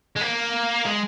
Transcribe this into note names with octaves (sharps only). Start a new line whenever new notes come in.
G#3
A#3
G#3